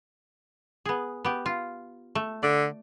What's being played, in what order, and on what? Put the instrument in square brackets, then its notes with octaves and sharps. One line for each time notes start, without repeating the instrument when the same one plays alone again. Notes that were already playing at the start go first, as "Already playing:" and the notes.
[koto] B3 G#4
B3 G4
F4
A3
[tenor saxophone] D3 [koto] D5